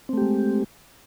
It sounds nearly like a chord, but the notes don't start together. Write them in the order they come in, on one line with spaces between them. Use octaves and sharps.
C4 A3 G4 G#3